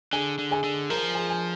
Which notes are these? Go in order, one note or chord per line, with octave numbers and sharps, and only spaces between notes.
D3 G#4 G#5
D3
G#4 G#5
D3
F3 A#4 A#5
G#4 G#5
G#5